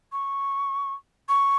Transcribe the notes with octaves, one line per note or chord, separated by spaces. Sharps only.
C#6
C#6